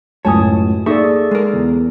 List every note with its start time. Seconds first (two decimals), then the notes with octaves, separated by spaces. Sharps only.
0.25 C#2 F#2 A2 C#5 G#5 A5 D#6
0.86 A#3 D#4 G#4 A4 D5 E5 C#6
1.31 G#3 A#4
1.53 E2